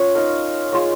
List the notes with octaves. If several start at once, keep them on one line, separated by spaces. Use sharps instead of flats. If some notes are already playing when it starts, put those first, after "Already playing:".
Already playing: C#4 F4 C#5
D#4 A#4 F5
G#3 F4 A#4 C#5